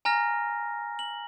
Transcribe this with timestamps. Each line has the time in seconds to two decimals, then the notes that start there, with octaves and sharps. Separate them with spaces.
0.05 G#5 A#5 F6 A#6
0.99 F#7